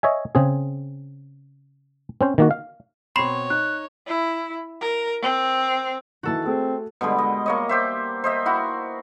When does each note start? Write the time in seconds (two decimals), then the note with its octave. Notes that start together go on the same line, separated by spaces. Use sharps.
0.03 C#5 D#5 E5 G#5
0.35 C#3 C4 G#4
2.21 C4 C#4 C5
2.38 D#3 A#3 F#4
2.51 F5
3.16 B2 C4 C#5 B5 C6 C7
3.50 D#4 F#6
4.07 E4
4.81 A#4
5.22 C4
6.23 D#3 E3 F#4 A4 A5
6.45 A3 C4 G#4
7.01 B2 D3 G3 G#3
7.18 D#5
7.46 A#3 C#5 D#5
7.69 G4 C5 E5
8.24 C5 D#5 E5
8.46 E4 F#4